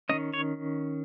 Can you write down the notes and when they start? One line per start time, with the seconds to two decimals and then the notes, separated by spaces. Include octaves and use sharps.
0.09 D#3 A#3 C#4 D#5
0.34 C#5